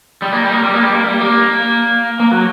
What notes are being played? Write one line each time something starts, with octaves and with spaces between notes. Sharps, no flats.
G3
A#3
G3
A#3
G3
A#3
G3
A#3
G3
A#3
A#3
F#3